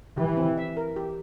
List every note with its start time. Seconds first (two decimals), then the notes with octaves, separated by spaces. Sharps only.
0.18 E3 G4
0.37 C4
0.57 E5
0.77 A#4
0.96 G4